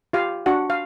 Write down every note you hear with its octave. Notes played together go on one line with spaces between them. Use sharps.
F4 G4 F5
D4 F#4 F#5
F5